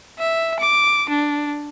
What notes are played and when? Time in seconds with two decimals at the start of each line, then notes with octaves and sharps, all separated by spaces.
0.19 E5
0.60 D6
1.10 D4